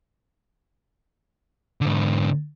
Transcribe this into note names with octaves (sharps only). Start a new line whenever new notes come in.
G#2 D3